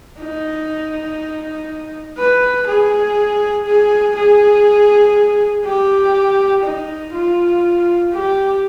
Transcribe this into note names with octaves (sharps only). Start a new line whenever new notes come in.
D#4
B4
G#4
G#4
G#4
G4
D#4
F4
G4